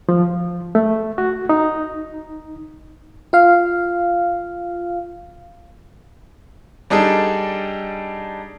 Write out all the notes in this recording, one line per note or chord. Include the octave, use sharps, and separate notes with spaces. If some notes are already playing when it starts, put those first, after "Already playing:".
F3
A3
F#4
D#4
F4 F5
G3 D4 D#4 G#4 A4